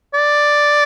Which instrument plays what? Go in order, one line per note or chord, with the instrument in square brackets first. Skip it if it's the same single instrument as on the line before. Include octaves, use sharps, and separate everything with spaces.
[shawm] D5